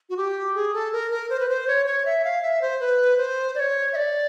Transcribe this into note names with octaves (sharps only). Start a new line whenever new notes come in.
F#4
G4
G#4
A4
A#4
A#4
C5
B4
C5
C#5
C#5
E5
F5
E5
C5
B4
C5
D5
C#5
E5
D5